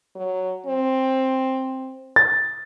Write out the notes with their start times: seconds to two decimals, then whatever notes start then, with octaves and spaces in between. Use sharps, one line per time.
0.15 F#3
0.66 C4
2.16 A6